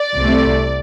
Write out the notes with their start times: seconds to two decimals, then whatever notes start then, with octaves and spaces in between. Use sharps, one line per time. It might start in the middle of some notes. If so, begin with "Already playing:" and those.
Already playing: D5
0.17 C2 C3 A3